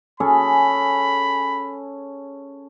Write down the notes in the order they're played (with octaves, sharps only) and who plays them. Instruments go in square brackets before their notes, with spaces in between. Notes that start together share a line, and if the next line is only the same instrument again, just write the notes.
[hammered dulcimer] C#4 G#4 A4 [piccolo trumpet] B5